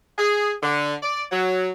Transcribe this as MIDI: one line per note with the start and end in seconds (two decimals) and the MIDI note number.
0.19 0.52 68
0.63 0.94 50
1.03 1.24 74
1.32 1.70 54